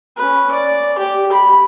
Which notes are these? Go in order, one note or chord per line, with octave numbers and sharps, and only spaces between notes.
C#4 B4
D5
G4
B5